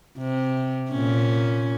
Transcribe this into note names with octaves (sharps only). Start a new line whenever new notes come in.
C3
A#2 C#4